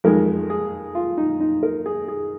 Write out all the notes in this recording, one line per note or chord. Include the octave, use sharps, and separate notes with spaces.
F2 D#3 G#3 A#4
G#4
F4
D#4
D#4
A#4
G#4
G#4